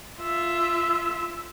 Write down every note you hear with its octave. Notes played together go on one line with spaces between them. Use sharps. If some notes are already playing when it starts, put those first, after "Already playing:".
F4 E5